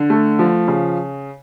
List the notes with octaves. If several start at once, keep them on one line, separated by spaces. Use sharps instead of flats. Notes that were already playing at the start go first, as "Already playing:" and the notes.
Already playing: D3
A3
F3
C#3